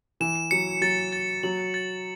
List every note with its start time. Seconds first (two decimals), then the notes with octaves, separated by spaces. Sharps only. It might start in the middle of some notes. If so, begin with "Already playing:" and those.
0.20 E3 E7
0.51 F#3 C#7
0.81 F#3 A6
1.13 A6
1.43 F#3 F#7
1.74 A6